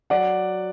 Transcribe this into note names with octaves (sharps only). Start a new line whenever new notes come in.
F#3 D5 F#5